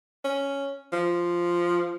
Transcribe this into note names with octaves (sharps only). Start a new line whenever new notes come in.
C#4
F3